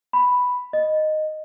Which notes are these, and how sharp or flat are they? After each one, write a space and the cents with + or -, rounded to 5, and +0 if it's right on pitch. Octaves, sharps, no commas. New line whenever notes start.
B5 +0
D#5 -5